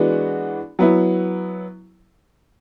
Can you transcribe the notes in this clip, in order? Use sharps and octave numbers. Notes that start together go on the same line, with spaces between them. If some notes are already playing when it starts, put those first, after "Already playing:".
Already playing: E3 G#3 B3 D4 F#4
F#3 B3 E4